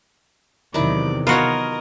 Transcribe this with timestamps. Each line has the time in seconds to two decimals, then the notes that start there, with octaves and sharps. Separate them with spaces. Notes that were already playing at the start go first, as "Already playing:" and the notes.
0.74 E2 C3 D#3 F#3 D#4 E4 D5
1.27 B3 F4 F#4 A#4 C#5 D#5